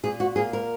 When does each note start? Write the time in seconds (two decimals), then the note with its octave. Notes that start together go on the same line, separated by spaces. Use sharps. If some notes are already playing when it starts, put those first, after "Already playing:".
0.03 A#2 G#4
0.20 F#4
0.36 A#3 G#4
0.53 A#4